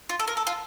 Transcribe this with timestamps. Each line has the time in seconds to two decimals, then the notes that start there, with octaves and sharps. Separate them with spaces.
0.09 F4
0.19 A4
0.28 A#4
0.37 A4
0.47 F4